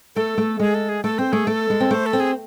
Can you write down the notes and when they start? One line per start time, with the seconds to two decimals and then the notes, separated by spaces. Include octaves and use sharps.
0.16 A3 A4
0.38 A3
0.59 G#3 G#4
0.74 A4
0.89 G#4
1.04 A3 A4
1.18 C4 C5
1.32 A3 G#4
1.47 A3 A4
1.70 G#3
1.80 C4
1.91 A3 C5
2.06 A4
2.13 C4
2.20 G#4